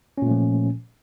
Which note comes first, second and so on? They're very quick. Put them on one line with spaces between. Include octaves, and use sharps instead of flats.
C#4 A#2 A3 F3